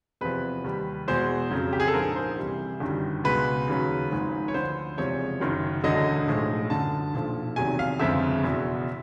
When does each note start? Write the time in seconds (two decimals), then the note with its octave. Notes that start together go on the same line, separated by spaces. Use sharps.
0.21 E2 C3 F3 B4
0.64 D#2 D#3 G3
1.08 E2 B2 G#3 C5
1.51 F2 C#3 F#3
1.73 G4
1.80 G#4
1.88 A4
1.94 A#1 G#2 F3 G#3 A#4
2.16 C5
2.38 C2 C3 E3 G3
2.80 G1 F#2 D#3 G3
3.24 C#2 B2 G#3 B4
3.68 D#2 C#3 F#3
4.11 G#1 G#2 F3 G#3
4.48 C#5
4.54 D2 D3 F3 C5
4.97 F#1 E2 C3 F3 G#3 C#5
5.40 F#1 F#2 D#3 F#3
5.84 E1 D2 D3 F#3 D#5
6.27 B1 A2 F3 G#3
6.70 G1 F#2 D3 A5
7.13 B1 A#2 F3
7.56 F1 E2 C3 D#3 F#3 G#5
7.79 F5
8.00 G1 F2 C#3 F3 G#3 E5
8.43 F#1 E2 B2